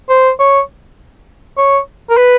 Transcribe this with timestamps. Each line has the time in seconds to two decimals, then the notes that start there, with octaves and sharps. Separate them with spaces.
0.09 C5
0.39 C#5
1.57 C#5
2.10 A#4
2.17 B4